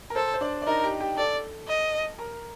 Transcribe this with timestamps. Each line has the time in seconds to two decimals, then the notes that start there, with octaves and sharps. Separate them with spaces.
0.10 A#4
0.15 A4 C5
0.34 C5
0.41 D4 D5
0.62 D5
0.67 D#4 A#4 D#5
0.83 G4 G5
1.00 G4 G5
1.17 A4 D5 A5
1.68 D#5
2.19 A#4 A#5